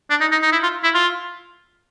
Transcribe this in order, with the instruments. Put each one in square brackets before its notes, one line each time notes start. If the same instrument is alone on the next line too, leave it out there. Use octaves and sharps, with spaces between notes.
[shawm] D4
D#4
D#4
D#4
E4
F4
E4
F4